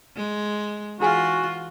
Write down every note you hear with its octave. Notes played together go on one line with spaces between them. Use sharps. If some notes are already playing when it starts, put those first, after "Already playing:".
G#3
E3 D#4 F4 F#4 G#4 G#5